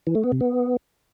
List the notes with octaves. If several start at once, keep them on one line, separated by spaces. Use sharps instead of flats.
E3
A3
B3
C3
B3